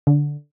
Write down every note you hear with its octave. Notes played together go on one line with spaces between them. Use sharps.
D3